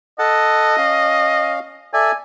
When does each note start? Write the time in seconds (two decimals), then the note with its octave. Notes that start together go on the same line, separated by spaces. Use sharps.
0.19 A4 D#5 F#5 A5
0.78 C#4 F5
1.93 A4 D5 E5 G#5